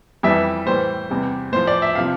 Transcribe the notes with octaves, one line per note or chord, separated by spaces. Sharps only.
F2 E3 G3 E5
A2 E3 G3 C5
E2 C3 G3
A2 F3 C5
D5
E5
C3 F3 F5